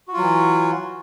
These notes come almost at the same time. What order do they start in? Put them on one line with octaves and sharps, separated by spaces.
F#4 F4 F#3 E3